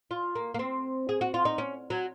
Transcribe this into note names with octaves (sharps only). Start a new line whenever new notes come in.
F4
A#3
A#3
C4
G#4
F#4
F4
D#4
C#4
F#3